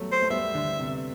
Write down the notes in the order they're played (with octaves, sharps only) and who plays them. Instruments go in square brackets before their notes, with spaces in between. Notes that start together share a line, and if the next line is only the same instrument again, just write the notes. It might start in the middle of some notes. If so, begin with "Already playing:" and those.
Already playing: [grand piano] F#3 G3 A3 B3
[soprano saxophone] C5
[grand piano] A3
[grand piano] G3 B3 [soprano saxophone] E5
[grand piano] D3
C3